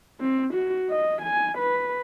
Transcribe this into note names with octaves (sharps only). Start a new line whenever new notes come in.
C4
F#4
D#5
G#5
B4